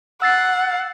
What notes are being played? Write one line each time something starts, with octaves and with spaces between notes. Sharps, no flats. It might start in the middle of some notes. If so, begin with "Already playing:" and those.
F#5 E6 A6 C7